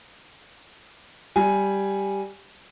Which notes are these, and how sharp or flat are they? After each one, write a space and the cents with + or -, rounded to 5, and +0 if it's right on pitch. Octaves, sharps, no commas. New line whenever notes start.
G3 +0 G#5 +0